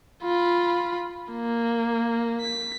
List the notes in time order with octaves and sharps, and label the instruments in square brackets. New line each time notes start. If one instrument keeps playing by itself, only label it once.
[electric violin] F4 B5
A#3
B6